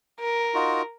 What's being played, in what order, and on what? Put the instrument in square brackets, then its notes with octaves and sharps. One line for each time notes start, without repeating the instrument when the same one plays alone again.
[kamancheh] A#4
[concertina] D#4 F4 F#4